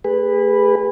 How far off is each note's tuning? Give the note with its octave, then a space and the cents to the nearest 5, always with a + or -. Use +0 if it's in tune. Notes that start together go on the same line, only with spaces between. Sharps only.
A3 +0 G#4 -35 B4 +0